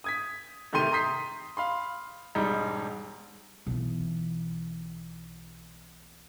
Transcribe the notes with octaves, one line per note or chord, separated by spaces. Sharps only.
D#6 G#6 B6
C3 D#3 A3 G4 C6 D#7
A#5 C6 D#6 G6 B6 C7
F5 B5 C6
E1 G#2 G3 D#4
B1 E3